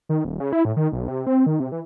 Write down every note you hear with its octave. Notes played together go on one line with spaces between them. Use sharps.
D#3
D#1
C#3
E4
A2
D#3
B1
C3
C4
D#3
C3
E3